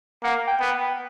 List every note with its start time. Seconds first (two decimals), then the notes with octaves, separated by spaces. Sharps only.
0.23 A#3 F#5
0.47 G5
0.60 B3 G5
0.72 F#5